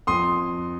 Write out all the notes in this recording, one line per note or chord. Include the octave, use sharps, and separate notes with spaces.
F2 C6 D#6